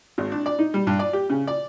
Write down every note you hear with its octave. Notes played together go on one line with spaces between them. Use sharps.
G#1
D4
D5
D#4
G3
G2
D5
G4
C#3
D5